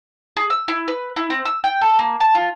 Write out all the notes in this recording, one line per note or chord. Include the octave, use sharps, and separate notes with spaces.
G#4
E6
E4
B4
E4
C4
E6
G5
A4
A#3
A5
F4